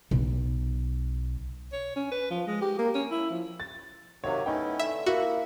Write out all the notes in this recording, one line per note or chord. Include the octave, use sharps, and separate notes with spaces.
B1
C#5
C#4
B4
F3
G#3
G4
A#3
C#4
E4
F3
A6
C3 D#3 F#3 C#5 F5 F#5
A3 B3 C#4 D#4 E4 G5
D3 E5
A#3 E4 F#4 E5